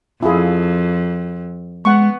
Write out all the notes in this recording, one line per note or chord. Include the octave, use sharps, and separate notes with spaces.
F2 E4 F4 G#4
G#3 B3 F#5 C#6